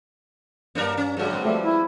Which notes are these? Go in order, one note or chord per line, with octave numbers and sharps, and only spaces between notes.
G2 A#3 D4 A#4 C#5
C#4
G2 D3 F#3 G#3 A4
B3 C4 B4
F3 G3 A3
E4